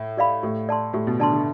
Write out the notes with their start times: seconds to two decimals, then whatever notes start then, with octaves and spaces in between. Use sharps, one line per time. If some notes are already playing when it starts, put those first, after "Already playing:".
Already playing: A2
0.17 G4 D5 F5 B5
0.43 A2 G4
0.69 D5 A5 C6
0.93 A2 G4
1.07 B2
1.20 D3 D5 A5 C6
1.32 D3